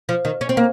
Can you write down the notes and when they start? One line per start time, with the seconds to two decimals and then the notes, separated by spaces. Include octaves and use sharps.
0.09 F3
0.25 D#3
0.41 C#4
0.49 C4
0.57 A#3